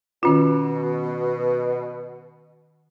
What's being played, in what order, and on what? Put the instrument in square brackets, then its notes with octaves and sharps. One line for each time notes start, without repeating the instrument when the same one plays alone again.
[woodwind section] B2 [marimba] D#3 C#4 F4